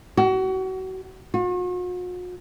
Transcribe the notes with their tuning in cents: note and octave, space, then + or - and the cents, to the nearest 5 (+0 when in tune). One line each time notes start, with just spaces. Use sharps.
F#4 +30
F#4 -45